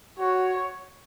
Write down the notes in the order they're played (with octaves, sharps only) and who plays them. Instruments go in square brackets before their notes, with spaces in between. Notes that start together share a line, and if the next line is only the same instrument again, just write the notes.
[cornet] F#4 [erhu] C#5